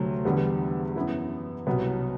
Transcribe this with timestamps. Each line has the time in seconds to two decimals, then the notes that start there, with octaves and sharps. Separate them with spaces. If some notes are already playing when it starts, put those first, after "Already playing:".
Already playing: D2 C3 F#3 A3
0.25 E2 D3 G3 B3
0.96 F#2 E3 B3 E4
1.67 C2 B2 F#3 B3